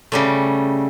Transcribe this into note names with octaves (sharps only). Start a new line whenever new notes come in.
C#3 G3 A3